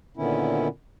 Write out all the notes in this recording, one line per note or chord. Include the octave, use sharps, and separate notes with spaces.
A#2 D3 D#3 B3 C#4 E4